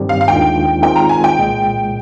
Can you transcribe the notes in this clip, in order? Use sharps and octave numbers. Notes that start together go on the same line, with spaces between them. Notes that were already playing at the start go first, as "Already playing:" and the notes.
Already playing: G2 D#3 G3 C4 G4
F5
F5
D#2 D#3 G#3 D4 F4 G5
D#3 G#3 C4 F4 A#4 G5
A#5
G#5
G5
C2 A#2 G#3